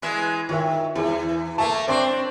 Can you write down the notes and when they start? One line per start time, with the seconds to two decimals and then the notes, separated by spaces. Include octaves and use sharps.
0.02 E3 G#3 E5
0.49 D#3 F4 C#5 E5
0.95 E2 E3
1.58 A3 A#3 E5 A5
1.88 C4 D4 C5 C#6 D6